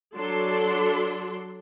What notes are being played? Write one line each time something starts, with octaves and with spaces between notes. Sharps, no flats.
F#3 D4 A4 C6